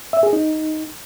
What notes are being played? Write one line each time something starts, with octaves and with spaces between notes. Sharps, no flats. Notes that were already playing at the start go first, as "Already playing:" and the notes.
E5
G#4
D#4